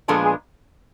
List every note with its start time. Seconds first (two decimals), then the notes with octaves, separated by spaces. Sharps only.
0.08 A#2 F3 G#3 B3 D4 A4
0.25 G#4